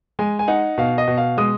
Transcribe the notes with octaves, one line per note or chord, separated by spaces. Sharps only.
G#3 G#5
G#5
D#4 F#5
B2 F5
D#5
B2
F5
G#3 D#6